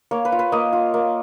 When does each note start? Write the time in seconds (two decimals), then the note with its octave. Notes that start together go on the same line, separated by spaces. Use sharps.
0.11 A#3 C#5
0.25 B4
0.32 F4
0.39 B4
0.52 A#3 D#5
0.73 F4
0.94 A#3